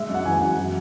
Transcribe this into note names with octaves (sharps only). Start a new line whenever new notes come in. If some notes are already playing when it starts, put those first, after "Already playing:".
Already playing: G#3 E5
F#2
F#5
E3 G#5
F#2 F#5
F#3